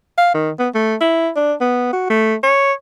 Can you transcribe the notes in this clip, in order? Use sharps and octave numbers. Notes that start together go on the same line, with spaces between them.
F5
D#3
B3
A3
E4
D4
B3
F#4
A3
C#5